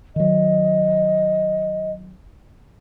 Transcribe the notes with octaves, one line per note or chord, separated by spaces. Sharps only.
D#3 F#3 D#5